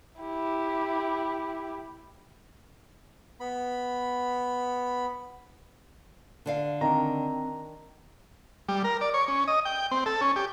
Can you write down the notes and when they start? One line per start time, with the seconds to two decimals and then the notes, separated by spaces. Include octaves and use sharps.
0.20 E4 G4
3.40 B3 B5
6.46 D3 D5 F5
6.81 D#3 C4 D4 A#5
8.68 G3
8.84 A#4
9.01 D5
9.14 C#5
9.28 C#4
9.48 D#5
9.65 G5
9.91 C4
10.06 A4
10.21 C#4
10.36 G4